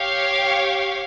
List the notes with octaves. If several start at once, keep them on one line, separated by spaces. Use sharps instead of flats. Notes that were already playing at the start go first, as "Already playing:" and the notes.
Already playing: G4 C#5 F5